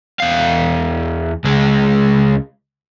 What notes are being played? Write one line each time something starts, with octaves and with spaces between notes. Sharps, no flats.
E2 F5
C#2 G#3